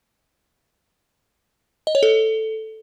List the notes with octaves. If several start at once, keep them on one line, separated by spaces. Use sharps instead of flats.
D#5
C#5
A4